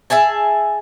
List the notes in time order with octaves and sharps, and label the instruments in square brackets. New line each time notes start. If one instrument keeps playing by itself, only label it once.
[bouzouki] G#4 E5 G#5 A5